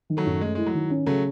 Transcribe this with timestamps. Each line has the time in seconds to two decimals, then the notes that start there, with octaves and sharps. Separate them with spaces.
0.10 D#3
0.17 F#3 A3
0.26 F#2
0.41 G#3 A3
0.55 G#3 E4
0.66 F#3
0.75 D#3
0.90 C#4
1.07 C#3 F#3 A3